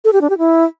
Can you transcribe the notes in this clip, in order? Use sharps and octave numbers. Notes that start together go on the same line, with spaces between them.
A4
G4
D4
G4
E4